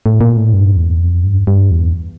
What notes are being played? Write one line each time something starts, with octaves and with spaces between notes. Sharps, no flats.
A2
A#2
A2
G2
E2
F2
G2
G2
E2